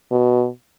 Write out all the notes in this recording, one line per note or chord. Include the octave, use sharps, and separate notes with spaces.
B2